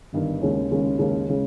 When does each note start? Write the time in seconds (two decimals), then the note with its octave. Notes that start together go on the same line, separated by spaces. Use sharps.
0.13 G1 G2 D#3
0.41 D#2 C#3 G#3 C#4
0.71 D#2 C#3 G#3 C#4
0.99 D#2 C#3 G#3 C#4
1.29 C#3 G#3 C#4